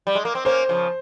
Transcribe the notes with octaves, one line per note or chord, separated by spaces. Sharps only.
G3
G#3
A#3
C4
A#3 C#4 C5
C#3 F3